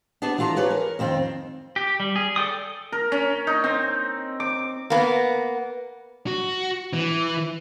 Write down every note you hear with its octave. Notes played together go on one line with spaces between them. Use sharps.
B3 D4 G#4 A5
E3 D4 F4 A4 A#5
G#4 B4 C#5 D5
A#4
F2 D#3 C4 F4
G4
G3
G#4
A4 D5 G5 D#6
A#4
C#4
D#4
C4
D6
A#3 B3
F#4
E3